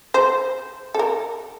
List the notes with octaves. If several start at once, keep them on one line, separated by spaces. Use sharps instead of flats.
C5
A4
A#4